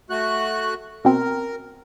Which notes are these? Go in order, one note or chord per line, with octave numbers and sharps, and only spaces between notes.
A3 F#4 F#6
B2 C4 A#4